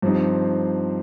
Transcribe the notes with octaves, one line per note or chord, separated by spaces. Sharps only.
G2 F3 C4 D#4